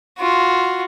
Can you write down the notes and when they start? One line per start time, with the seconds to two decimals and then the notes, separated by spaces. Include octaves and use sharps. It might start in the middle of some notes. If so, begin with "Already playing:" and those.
0.19 F4 F#4